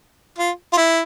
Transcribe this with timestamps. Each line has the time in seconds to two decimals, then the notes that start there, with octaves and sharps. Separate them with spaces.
0.39 F4
0.73 F4
0.77 E4